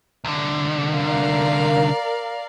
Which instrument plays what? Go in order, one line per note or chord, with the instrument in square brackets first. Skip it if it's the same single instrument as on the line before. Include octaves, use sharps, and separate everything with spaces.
[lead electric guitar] C2 D3
[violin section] A#4 D5 F5